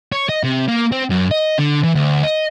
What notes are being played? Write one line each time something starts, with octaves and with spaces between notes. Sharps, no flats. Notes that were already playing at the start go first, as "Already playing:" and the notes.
C#5
D#5
C3
A#3
C4
F#2
D#5
D3
E3
D2
D#5